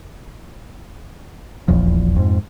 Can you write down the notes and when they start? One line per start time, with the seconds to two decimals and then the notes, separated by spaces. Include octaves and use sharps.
1.68 D#1 A#1 E2 F3
2.16 F2 G#2